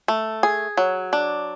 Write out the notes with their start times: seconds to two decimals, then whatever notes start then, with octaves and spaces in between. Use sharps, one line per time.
0.08 A3
0.43 G#4
0.77 F#3
1.13 D4